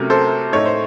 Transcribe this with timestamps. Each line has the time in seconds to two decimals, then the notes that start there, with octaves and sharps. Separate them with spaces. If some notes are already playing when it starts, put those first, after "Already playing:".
Already playing: C3 F#3 A3 C#4 A#4
0.10 A4 C5
0.53 A2 A3 D#4 C#5
0.65 C5